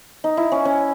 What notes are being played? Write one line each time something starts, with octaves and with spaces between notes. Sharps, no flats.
D#4
E4
C#4
C#4